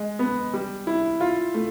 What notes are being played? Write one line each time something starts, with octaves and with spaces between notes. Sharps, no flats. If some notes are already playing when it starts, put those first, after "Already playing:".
Already playing: G#3
B3
G3
E4
F4
A3